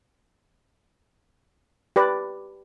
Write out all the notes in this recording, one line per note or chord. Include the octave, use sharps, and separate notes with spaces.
G4 B4 D5